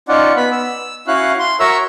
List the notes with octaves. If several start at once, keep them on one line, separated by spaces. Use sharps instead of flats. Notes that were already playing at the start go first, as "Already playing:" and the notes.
C#4 D#4 F4 D5 F#5
B3 B5
E6
C#4 E4 F#4 F5 F#6
C6
F#4 A#4 C#5 E5 A#5 E6